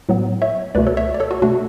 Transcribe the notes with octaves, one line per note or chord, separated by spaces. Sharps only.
A2 F#3 B3
C#5 E5
C#2 B2 A3 B4 D5
A4 C#5
C#5 E5
D5
A4 C#5
F#4 A4
B2 A3 D4 F#4